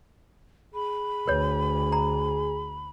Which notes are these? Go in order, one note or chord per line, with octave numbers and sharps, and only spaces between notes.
G#4 B5
D2 B4 C#5
A#5